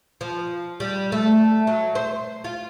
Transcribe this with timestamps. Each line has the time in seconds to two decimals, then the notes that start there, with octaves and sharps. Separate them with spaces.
0.21 F3
0.80 G3
1.12 A3
1.67 F#3
1.95 C5
2.44 F4